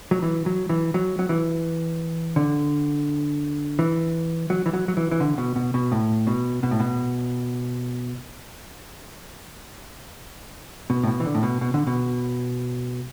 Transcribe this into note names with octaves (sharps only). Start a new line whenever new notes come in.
F#3
E3
F#3
E3
F#3
F#3
E3
D3
E3
F#3
E3
F#3
F#3
E3
E3
D3
B2
B2
B2
A2
B2
B2
A2
B2
B2
A2
B2
E3
D3
A2
B2
B2
D3
B2